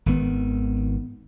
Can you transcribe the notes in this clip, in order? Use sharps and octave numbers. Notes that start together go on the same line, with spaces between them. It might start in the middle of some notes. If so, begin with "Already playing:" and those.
G#1 D#3 B3